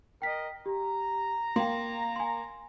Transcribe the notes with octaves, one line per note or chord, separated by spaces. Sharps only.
A#4 D#5 G5 B6
G4 A#5
A#3 G5 C6
G#5 C6